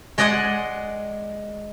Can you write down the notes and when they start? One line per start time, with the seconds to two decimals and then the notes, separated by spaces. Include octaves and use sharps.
0.18 G#3 D5 D#5 F#5 G#5